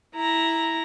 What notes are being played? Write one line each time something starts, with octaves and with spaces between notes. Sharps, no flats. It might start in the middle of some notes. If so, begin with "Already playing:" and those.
E4 A#5